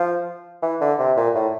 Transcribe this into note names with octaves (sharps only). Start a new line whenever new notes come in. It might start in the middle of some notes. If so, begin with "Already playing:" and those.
Already playing: F3
E3
D3
C3
A#2
A2